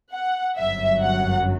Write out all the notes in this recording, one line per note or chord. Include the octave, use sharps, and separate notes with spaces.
F#5
G1 F#2 F#3 E5
F#5